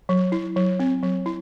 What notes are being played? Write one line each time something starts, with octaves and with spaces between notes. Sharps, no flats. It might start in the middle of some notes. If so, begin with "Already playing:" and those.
F#3
E4
F#3
C4
F#3
E4